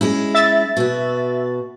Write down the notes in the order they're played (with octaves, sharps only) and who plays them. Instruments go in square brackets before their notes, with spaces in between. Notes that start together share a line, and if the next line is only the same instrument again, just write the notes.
[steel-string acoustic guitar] G#3 C#4 E4
[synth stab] E5 A6
[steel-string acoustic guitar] B2 F#4